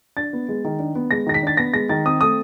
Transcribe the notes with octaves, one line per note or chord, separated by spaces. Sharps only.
D4 A6
B3
G#3
D#3
D4
B3
G#3 A#6
D#3 A#6
B6
D4 A6
B3 A#6
G#3 A#6
D#3 A6
C4 D#6
A3 D#6